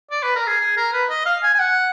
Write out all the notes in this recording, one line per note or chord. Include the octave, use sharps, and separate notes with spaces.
D5
B4
A#4
G#4
G#4
A#4
B4
D#5
F5
G#5
G#5
F#5